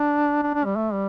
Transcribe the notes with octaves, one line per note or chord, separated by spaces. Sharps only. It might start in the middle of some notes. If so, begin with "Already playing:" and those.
Already playing: D4
D4
D4
G3
A3
G3